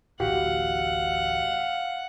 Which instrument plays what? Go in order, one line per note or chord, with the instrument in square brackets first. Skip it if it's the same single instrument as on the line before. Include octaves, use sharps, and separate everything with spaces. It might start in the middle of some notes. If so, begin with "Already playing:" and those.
[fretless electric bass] D1 A1 [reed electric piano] F#4 G4 [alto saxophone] F5 [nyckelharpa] F#5